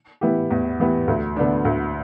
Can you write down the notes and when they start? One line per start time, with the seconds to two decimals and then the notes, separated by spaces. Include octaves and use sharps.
0.21 E3 B3 E4 G4
0.51 E2
0.80 E3 B3 E4 G4
1.08 D2
1.36 D3 B3 D4
1.65 D2